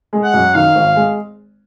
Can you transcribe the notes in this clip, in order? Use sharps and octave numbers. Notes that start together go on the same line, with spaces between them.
G#3
F#5
F#2
D#3 F5
G#1
G#3